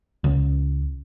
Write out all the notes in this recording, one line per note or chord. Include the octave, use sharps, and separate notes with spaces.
C#2